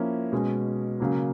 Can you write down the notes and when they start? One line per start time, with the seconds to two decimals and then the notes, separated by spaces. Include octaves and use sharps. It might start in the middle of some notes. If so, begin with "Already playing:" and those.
Already playing: F3 A#3 C#4 E4
0.32 B2 G#3 C#4
1.00 C#3 F#3 A#3